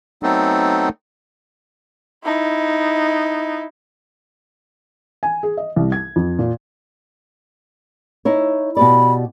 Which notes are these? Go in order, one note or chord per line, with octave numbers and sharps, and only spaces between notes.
F#3 A3 B3 C4 D#4 A4
D#4 E4
G#5
G#4
D#5
C2
G#6
F2
A#2
D#4 E4 C#5
B2 G4 D5 B5